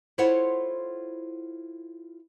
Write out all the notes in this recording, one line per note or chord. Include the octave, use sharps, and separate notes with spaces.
E4 F4 A4 C5 C#5 F#5